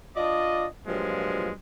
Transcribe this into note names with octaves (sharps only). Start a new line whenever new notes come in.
D4 F4 D5 D#5
G2 A#2 F3 F#3 G#3